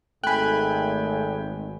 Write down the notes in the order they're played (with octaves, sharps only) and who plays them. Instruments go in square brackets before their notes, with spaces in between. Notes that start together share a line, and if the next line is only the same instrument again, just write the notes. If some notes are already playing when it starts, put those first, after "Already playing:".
[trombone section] G#1 [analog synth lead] A3 [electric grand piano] G5 G#5 [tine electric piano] B5 F#6